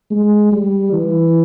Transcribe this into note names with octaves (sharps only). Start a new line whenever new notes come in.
G#3
G3
E3